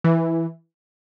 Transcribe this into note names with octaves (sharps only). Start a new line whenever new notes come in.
E3